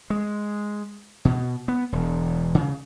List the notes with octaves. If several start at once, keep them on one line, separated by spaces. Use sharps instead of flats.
G#3
B2
B3
E1
C#3